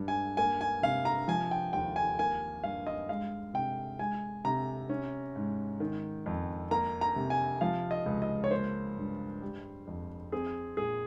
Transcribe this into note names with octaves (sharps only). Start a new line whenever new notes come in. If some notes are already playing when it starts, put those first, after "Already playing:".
Already playing: G2
G#5
A#3 G#5
G#5
C3 F5
A#5
F3 G#5
G5
D#2 G5
G#5
A#3 G#5
G2 F5
D#5
G#3 F5
C3 G5
G#3 G#5
C3 A#5
C#4
G#2
D#3
F2
A#3 A#5
A#5
C3
G#5
F3 F5
D#5
C#2
D#5
C#5
A#3 C5
G2
G3
F2
C4 G#4
A#2 G#4